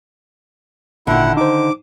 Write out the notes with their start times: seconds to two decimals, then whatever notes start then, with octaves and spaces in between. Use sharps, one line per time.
1.07 G#1 A#2 D3 D#3 E4 F#5
1.37 D#4 C5 D6